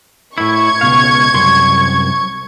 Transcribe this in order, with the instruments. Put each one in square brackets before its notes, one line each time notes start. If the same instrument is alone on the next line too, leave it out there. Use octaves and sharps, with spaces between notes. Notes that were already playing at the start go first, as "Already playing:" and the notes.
[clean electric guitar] A2 E4 [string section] C#6 G#6
[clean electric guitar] C#2 B2 F5
C2 F#2 C6